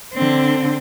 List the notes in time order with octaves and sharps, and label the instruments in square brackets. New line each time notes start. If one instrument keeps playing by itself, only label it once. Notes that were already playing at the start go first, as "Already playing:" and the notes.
[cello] D3 C4